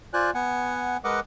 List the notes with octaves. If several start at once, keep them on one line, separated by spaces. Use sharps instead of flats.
F4 C5 D5 G#5 F#6
B3 F#5 G#5
G#3 A#4 B4 D#5 F#5 D6